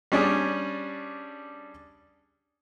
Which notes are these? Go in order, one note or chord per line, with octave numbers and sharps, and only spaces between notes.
G3 C#4 D4 G#4